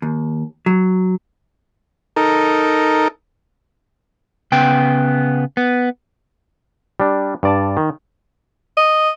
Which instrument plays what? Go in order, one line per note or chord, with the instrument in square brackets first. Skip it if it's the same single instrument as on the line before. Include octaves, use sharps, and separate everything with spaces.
[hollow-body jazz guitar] D#2
F#3
[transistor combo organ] D#4 A4 A#4
[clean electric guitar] C#3 B3 G5
B3
[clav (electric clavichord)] G3 D4
G2 D5 A5
D#3
[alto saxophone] D#5